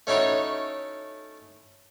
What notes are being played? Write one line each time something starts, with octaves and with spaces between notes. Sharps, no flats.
A3 C#4 D#4 E4 F#4 C#5